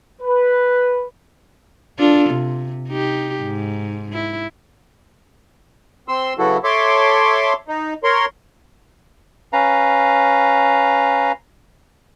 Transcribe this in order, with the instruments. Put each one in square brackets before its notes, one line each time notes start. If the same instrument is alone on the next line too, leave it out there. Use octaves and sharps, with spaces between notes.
[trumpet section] B4
[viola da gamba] D4 F4 A4
C3
D#4 G4
G#2
E4
[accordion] C4 C6 E6
C#3 F#3 B3 E4 F#4 A4
A4 C#5 E5 C6 D6
D#4
A#4 C#5 C6
[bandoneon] C#4 B4 F5 A#5